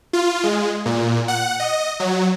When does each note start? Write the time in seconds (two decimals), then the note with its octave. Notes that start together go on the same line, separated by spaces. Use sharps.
0.13 F4
0.44 G#3
0.86 A#2
1.28 F#5
1.60 D#5
2.00 F#3